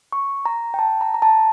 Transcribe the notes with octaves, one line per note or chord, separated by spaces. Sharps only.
C#6
A#5
G5
A5
A#5
A#5
A5